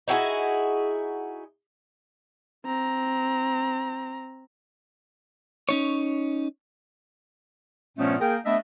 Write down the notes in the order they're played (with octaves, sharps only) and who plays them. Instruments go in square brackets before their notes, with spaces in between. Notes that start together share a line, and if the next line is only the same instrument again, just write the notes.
[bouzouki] D#4 E4 F#4 G#4
[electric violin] C4 A#5
[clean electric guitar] C#4 D#4 C#5
[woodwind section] G2 A#2 F3 A3 B3 C#4
A#3 G#4 A#4 G5
A3 B3 D4 D#5 E5